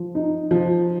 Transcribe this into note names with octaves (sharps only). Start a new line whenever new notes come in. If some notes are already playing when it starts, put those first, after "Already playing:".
Already playing: F3
D#4
F3